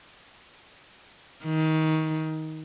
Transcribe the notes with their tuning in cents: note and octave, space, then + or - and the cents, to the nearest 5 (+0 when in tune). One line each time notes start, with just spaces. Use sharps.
D#3 +20